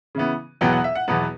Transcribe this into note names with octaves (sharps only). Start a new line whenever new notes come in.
C#3 E3 B3
E2 B2 F#3 B3 G5
F#5
E5
F#5
E2 B2 F#3 B3